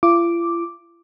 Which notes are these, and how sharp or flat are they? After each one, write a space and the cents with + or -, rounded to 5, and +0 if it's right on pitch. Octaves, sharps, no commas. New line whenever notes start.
F4 -45 D6 +0